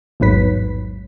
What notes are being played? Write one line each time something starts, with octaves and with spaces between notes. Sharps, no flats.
A1 E2 G#2 F#3 B4 B6